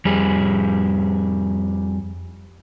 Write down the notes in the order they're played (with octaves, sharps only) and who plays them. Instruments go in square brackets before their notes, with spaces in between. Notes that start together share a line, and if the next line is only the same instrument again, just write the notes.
[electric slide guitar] F2 G3 G#4